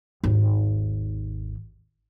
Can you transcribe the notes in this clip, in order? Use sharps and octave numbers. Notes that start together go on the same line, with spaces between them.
G#1 D#2